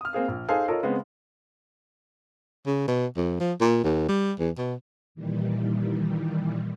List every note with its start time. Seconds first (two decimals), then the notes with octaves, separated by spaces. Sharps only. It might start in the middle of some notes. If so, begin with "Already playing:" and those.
0.01 D#6 F6
0.13 A#3 C4 G#4 F5
0.28 A#1
0.49 D#4 G#4 A4 C5 F5 G#5
0.68 F4 A4 A#4 C#5 D#5
0.83 C#3 G#3 B3 C4
2.66 C#3
2.88 B2
3.17 F2
3.40 F3
3.60 A#2
3.84 D#2
4.08 G3
4.39 E2
4.58 B2
5.15 A#2 D#3 E3 G3